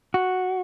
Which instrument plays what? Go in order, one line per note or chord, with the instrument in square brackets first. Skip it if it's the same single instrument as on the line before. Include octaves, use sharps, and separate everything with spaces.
[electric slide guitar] F#4